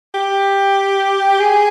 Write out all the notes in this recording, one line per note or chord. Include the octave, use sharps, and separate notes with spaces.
G4
G#4